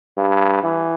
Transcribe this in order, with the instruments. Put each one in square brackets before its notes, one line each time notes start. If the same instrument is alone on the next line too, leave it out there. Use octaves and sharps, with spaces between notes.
[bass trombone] G2
E3